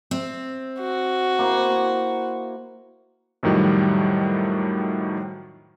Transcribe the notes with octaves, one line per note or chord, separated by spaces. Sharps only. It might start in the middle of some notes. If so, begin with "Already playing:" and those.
C4 E5
F#4
A#3 E4 C5
F2 A2 D#3 F#3 G3